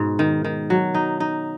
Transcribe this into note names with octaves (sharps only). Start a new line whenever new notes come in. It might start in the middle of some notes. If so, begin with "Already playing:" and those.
Already playing: G#2 B2
D#3
D#3
F#3
D#4
D#4